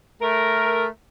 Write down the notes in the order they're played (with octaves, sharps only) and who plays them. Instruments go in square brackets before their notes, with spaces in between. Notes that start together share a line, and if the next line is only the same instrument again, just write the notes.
[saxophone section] A3 A#4